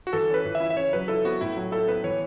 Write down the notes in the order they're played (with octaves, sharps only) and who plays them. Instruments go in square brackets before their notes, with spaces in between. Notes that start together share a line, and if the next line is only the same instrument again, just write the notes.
[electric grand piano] F#4
[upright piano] E3 [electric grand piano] A4
[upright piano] C#4 [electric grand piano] B4
[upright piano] E3
[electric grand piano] E5
[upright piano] E4
[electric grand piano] E5
[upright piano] C#3 [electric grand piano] C#5
[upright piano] F#3 [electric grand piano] B4
[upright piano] E4 [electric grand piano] A4
[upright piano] B3 [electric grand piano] F#4
[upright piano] A2 [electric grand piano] E4
[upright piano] F#3
[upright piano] E4 [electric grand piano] A4
[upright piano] B3 [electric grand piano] B4
[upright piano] E3 [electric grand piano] C#5